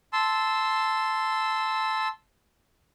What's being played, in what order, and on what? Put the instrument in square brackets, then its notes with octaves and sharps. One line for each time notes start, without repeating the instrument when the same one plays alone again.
[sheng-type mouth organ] A5 C6 E6